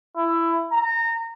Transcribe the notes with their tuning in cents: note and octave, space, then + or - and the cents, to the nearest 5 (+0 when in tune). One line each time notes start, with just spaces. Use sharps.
E4 +15
A#5 -25